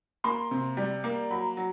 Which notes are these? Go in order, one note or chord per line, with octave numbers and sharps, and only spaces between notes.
A#3 C6
C3
G3
A#3
F#3 B5
F#3